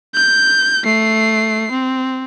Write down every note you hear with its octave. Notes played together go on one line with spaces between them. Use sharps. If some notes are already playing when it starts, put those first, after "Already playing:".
G6
A3 C7
C4